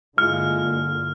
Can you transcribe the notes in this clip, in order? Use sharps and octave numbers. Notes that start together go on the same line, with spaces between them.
G2 D3 G#3 A#3 E4 F4 F6